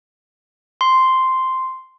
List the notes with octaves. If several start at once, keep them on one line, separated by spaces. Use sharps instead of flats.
C6